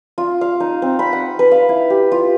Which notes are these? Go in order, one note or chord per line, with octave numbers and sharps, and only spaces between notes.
F4
F5
D#4
C4
B5
F#5
B4
F5
E4
G4
F4